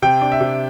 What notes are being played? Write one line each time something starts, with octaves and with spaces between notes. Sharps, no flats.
C3 G5
D4
E5
C3